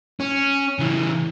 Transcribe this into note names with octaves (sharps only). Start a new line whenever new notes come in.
C#4
C#3 E3